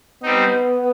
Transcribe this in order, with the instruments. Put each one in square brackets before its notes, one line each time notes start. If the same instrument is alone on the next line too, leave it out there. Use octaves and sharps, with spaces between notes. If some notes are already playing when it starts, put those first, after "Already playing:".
[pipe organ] G3 C4 D#4 [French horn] B3